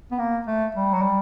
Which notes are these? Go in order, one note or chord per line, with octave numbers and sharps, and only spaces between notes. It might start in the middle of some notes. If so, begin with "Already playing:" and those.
B3
A#3
A3
G3
F#3
G3